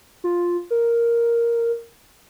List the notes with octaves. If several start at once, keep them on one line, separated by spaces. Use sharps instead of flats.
F4
A#4